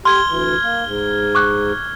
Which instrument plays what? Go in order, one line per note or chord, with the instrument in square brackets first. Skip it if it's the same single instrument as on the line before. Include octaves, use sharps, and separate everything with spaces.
[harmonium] G4 [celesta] C6 [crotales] F6 G#6 G7
[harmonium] D2 E3
A#3
G#2
[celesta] C#6 D6 F#6